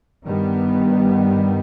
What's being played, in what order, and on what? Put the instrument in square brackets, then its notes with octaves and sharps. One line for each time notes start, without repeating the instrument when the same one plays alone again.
[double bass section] G2 D#3 G3 B3